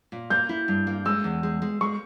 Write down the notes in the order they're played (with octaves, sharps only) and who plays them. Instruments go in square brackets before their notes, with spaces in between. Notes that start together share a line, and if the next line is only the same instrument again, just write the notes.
[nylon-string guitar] A#2
[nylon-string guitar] A#3 [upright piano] G6
[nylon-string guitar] E4
G2
A#3
[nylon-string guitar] G#3 [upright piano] E6
[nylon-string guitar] E2
G#3
G#3
[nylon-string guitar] G#3 [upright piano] C#6